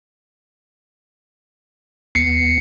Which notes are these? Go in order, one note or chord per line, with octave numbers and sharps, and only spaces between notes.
D#2 B3 C7 C#7